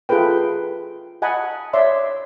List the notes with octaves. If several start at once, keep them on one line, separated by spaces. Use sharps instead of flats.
F4 G#4 A4 B4 G5
D#5 F#5 G#5 A5 B5
C#5 D5 E5 C6